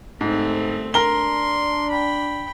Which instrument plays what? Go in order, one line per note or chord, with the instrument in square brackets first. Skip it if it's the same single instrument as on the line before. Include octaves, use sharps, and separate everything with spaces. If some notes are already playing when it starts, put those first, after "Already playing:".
[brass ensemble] G1 C2 [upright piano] G#2 [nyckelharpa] A3 C4
[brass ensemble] D4 [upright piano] A#4 G7 [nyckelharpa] C6
[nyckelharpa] G5 B5